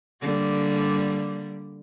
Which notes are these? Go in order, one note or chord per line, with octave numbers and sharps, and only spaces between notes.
D3 G3 A#3